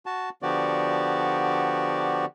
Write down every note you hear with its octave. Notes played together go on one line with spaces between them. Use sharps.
F#4 A5
D3 F3 B3 F#4 G4 D5